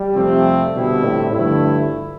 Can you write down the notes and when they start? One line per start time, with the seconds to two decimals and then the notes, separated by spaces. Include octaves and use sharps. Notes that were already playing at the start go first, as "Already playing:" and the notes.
Already playing: G3
0.15 F2 C3 F3 A3 C4
0.74 B2 D3 G3 C4 E4
1.04 A2
1.34 G2 D3 F3 A3 E4